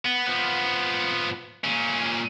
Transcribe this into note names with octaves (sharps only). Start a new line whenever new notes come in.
B3
F3 B3
A#2 C#4